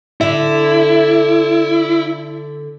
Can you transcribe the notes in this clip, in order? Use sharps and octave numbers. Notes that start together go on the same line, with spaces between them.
D3 E4 E5